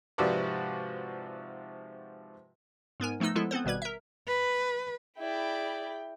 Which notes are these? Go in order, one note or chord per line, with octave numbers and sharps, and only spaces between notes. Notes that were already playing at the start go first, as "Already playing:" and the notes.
G#2 C3 F3 F#4 B4 D5
G#2 B3 A#4 G#5
F3 A3 B3 D#4 E6
F3 G#3 B3 E4 A4
B3 C4 A4 C5
G#1 B2 G3 B4 G#6
A#4 E5
B4
E4 G#4 D5 G5 B5